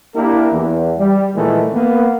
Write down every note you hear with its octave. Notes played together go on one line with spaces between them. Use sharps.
A#3 D4 E4 G4 A#4
E2
G3
A#2 D#3 E3 G#3 A3
A#3 B3